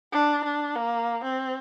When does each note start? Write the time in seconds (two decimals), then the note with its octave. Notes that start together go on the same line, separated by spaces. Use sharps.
0.13 D4
0.44 D4
0.75 A#3
1.23 C4